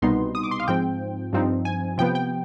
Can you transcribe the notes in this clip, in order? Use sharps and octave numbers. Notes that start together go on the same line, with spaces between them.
C2 B2 G3 B3 D#4 C6
D#6
D6
C6
F5
G#2 F3 C4 G5
G2 F3 C4 D#4
G#5
C3 F3 B3 G5
G5